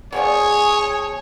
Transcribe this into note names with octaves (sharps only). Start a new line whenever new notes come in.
B2 F3 G#4 C#5 D5 G#5